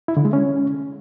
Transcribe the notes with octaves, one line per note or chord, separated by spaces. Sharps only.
E4
D3
G#3
C#4